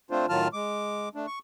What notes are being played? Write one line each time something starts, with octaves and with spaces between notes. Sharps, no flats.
A3 C4 D4 F4 C5
A2 D#3 F#3 F4 A5 F6
G#3 D6
A3 D4
C#6